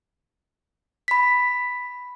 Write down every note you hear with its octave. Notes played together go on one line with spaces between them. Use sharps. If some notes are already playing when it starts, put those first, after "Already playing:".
B5 B6